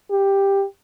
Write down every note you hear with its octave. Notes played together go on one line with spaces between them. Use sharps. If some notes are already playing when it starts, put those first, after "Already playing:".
G4